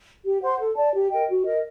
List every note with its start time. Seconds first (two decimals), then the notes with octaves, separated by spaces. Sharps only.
0.23 G4
0.42 C5 F#5 C6
0.59 A4
0.76 D5 A5
0.93 G4
1.11 A#4 D#5 G5
1.27 F#4
1.45 A#4 D#5